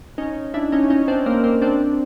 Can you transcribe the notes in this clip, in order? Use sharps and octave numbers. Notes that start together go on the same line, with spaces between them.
C#4 D#4
D4 E4
C#4 D#4
C#4 D#4
C4 D4
A#3 C4
A#3 C4
C4 D4